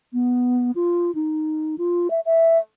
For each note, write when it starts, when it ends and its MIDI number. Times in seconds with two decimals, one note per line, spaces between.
0.13 0.71 59
0.75 1.14 65
1.15 1.76 63
1.78 2.10 65
2.10 2.20 76
2.25 2.58 76